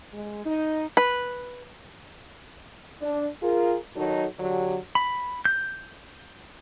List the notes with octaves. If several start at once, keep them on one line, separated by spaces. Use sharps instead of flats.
G#3
D#4
B4
D4
F4 G#4 A#4
D#3 F#3 D#4 F#4 A4
D3 F#3 G4
B5
G6